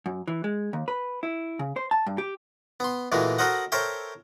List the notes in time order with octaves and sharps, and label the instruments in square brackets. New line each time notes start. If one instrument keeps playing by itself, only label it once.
[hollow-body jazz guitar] F#2
E3
G#3
D#2
B4
E4
C#3
C5
A5
G2
G4
[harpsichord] B3 C6
A#2 E3 G#3 A3 F#4
F#4 A4 A#4 C5 D#5 F#5
A4 A#4 C5 C#5 E5 G5